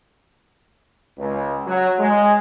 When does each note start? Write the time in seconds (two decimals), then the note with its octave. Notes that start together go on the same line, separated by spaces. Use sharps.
1.18 C#2
1.65 F#3
1.99 G#3